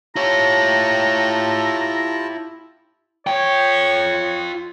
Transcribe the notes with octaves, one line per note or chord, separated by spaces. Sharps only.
E4 F4 G4 C#5 A5 A#5
F4 C#5 G5